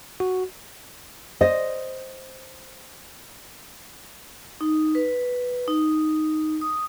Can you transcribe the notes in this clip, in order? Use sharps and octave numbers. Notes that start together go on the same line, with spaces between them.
F#4
C5 D#5
D#4
B4
D#4
D#6